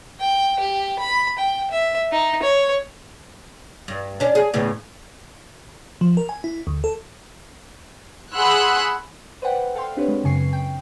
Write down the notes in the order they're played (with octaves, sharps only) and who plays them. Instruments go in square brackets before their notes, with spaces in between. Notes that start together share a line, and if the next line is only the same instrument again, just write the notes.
[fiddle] G5
G4
B5
G5
E5
D#4
C#5
[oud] G2
C#4 D4
G#4
E2 A2 C#3
[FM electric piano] F3
A#4
G#5
E4
D2
A4
[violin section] G#4 F#5 B5 C6 E6 F#6
[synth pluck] B4 C5 D5 F#5 G5
A4 F5 G5 C6
C4 D4 G4 B4 C#5
G#3
F#2 C#3 G#5 C#6 C7
G5